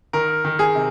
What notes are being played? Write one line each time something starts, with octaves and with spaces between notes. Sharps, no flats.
D#3 A#4
D#3
G#4
C3